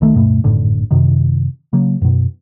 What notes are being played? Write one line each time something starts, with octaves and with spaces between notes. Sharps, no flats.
C2 D#3 A3
D1 G2 B2 A3
G#1 F#2 A2 D3
F#2 C3 D#3
C#3 F#3 A#3
F#2 B2